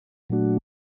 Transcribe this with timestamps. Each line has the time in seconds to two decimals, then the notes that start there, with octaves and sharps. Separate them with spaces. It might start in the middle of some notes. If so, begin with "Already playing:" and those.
0.30 A#2 F#3 A3 D4 F#4